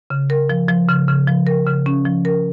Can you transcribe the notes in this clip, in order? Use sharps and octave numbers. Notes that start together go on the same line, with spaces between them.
C#3
A#4
F3
F3
C#3
C#3
F3
A#4
C#3
C#4
F3
A#4